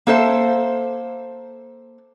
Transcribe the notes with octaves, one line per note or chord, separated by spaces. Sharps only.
A#3 A4 C5 E5